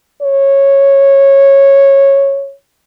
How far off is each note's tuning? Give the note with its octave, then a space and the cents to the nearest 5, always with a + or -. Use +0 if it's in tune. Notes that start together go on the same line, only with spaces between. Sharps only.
C#5 -10